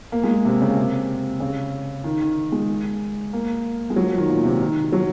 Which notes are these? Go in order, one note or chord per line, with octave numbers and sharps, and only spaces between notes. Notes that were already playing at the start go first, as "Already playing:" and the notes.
A#3
G#3
C3
C#3
C3
C#3
D#3
D#3
G#3
A#3
G#3
F#3
F3
D#3
A#2
C3
D#3
F#3